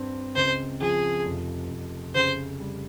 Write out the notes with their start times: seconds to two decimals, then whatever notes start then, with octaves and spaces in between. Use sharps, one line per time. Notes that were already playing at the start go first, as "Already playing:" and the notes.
Already playing: G2 C4
0.36 C#2 C5
0.81 F3 G#4
1.25 F1
1.70 F1
2.14 C#3 C5
2.60 G3